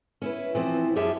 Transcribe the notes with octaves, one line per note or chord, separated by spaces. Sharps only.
C#4 E4 B4
E3 F3 C4
F#2 C#4 G4 G#4 E5 A5